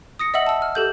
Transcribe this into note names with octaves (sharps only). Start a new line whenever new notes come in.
D#6 A#6 C#7
D#5 E5 F#5 E6 F#7
A5 E6
F6
G4 A4 G6